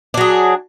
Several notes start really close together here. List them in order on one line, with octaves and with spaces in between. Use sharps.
D4 F#3 G#4